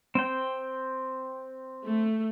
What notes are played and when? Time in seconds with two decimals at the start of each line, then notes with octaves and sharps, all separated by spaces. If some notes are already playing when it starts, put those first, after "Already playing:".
0.15 C4 G5
1.84 A3